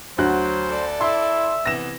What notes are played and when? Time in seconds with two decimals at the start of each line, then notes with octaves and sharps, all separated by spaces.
0.18 D2 F#3 F#4 C5 F#6
0.66 A4 D5
1.01 E4 E5 C6
1.65 C3 E3 B3 A#6 E7